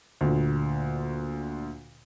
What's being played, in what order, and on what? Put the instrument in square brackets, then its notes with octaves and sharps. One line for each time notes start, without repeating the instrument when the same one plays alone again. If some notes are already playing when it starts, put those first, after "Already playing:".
[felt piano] D2 A#2